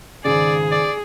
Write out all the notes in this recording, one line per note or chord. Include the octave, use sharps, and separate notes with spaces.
G#1 C#3 G#4 D5
D5